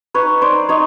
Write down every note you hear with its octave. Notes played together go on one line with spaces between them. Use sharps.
D#4 B4 C#5
D#4 C5 D5
D#4 C#5 D#5